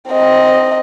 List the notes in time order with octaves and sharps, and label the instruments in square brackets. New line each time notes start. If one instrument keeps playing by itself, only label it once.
[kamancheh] C4 D#5